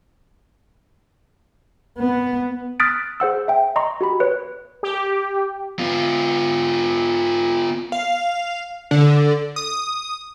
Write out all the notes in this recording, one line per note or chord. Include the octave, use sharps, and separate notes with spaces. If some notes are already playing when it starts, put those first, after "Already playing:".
B3
D#6 F6 F#6 A6 B6 D7
G#4 C5 F#5 E6
E5 G5
D#5 A#5 C6 C#6
F#4 G4 B5
B4 C#5
G4
B3 F4
F5
D3
D#6